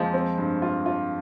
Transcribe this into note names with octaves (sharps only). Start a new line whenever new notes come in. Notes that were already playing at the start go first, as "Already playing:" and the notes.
Already playing: F2 F3 G#3 A#3
C4
G2
F4
F4